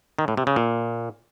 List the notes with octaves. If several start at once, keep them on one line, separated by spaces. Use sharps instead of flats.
D#3
A2
C3
C#3
A#2